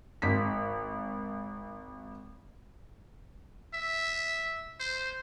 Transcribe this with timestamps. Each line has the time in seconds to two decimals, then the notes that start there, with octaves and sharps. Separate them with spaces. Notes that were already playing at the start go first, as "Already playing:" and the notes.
0.22 G#1 B6
3.74 E5
4.80 C5